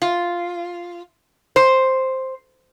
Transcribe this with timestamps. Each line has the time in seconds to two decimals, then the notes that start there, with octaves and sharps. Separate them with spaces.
0.02 F4
1.56 C5